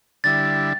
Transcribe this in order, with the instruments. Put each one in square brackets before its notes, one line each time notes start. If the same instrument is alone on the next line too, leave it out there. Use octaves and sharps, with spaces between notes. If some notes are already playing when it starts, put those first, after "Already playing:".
[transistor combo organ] D3 G3 E4 [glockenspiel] A6